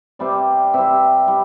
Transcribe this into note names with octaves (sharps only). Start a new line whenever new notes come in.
C3 G3 D5
C3 G3 E5
G3